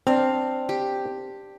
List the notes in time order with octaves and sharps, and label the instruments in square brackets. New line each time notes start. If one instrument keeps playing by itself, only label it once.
[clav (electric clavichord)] C4 [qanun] D4 F5
[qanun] G4